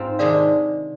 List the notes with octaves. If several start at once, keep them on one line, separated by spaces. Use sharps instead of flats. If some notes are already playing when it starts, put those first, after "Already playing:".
Already playing: G#2 C4 F4
C3 D#3 G#3 D4 G#4 D5 F5
D5